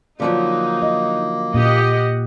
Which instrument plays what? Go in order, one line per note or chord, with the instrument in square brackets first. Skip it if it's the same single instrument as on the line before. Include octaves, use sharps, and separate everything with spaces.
[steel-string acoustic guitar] D3 F3 F#3 [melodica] A#3 [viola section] D#4
[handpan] D#5
[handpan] A#2 [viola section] G4 D#5 F#5